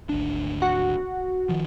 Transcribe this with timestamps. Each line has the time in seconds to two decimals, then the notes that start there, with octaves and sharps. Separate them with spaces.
0.09 G#1 D2 D4
0.62 F#4
1.49 D#3 F3